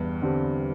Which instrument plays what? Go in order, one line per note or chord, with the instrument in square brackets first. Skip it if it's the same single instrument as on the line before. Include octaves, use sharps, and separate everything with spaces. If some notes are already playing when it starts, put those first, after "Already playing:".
Already playing: [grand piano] E2 [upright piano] G2
[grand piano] D3 G3 C4